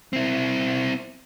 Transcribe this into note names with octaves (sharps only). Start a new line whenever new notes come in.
C4 E4